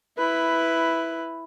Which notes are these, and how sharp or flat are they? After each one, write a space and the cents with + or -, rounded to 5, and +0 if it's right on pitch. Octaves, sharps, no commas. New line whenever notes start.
E4 +0 B4 +5